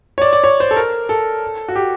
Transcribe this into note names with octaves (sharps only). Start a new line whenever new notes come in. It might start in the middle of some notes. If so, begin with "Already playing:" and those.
C#5
D5
D5
C#5
C5
A4
A#4
A4
F#4
G4